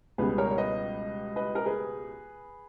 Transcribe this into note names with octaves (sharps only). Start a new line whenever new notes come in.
C#2 B2 G3 G#4 B4
A#4 C#5
C#5
B4 D#5
B4 D#5
A#4
G#4 B4